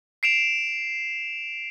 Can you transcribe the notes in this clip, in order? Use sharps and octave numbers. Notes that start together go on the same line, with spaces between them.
C7 D7 E7 F7